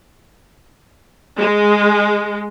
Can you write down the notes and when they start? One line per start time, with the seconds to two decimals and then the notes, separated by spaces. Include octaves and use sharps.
1.38 G#3